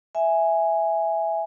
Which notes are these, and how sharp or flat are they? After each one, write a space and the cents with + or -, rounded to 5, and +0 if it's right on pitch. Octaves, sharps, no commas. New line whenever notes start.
E5 +0 G#5 +0